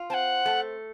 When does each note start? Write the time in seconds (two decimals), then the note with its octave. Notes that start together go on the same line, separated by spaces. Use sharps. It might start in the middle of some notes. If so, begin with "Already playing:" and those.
Already playing: F4
0.10 C4 F#5 A5
0.46 A3